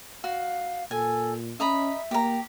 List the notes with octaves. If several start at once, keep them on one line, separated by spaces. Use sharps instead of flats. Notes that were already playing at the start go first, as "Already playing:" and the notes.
F#4 F5
A#2 A4 G#5
C#4 D#5 E5 A#5 B5
A#3 G4 A#5